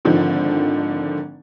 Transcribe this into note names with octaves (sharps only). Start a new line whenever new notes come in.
G#1 D3 D#3 F3